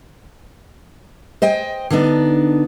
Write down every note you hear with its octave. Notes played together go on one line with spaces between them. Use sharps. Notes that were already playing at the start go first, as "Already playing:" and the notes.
C5 D#5 G5 G#5
D3 B3 D4 D#4